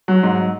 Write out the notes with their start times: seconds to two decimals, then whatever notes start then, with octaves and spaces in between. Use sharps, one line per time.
0.08 F#3
0.23 G#2